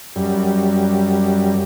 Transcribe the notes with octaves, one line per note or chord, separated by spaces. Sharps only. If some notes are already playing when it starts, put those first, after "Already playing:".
F#2 G3